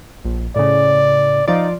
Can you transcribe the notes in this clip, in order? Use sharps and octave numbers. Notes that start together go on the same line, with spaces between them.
A#1
A2 C#3 D5
F3 D#4 F4 D5